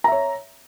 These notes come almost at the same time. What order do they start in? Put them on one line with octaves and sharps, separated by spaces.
A#5 E5 C#5